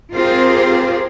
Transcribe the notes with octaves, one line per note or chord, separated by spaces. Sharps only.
C4 F4 G4 G#4 A#4 C5